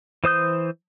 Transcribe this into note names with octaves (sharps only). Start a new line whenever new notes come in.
E3 C5 D#6 G6